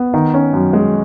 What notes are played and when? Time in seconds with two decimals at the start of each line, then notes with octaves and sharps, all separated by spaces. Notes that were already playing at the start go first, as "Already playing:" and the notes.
Already playing: B3
0.14 D#3
0.34 C#4
0.54 F#2
0.73 G#3